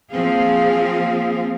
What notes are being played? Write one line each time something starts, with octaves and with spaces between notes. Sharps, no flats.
F3 A#3 C4 G#4 F5